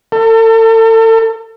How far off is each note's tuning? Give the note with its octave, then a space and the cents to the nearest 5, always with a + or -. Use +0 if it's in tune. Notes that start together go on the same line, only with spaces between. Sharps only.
A4 +40